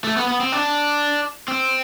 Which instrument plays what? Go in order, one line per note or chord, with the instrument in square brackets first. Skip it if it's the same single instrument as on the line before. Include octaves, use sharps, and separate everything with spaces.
[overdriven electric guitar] A3
B3
B3
C4
D4
C4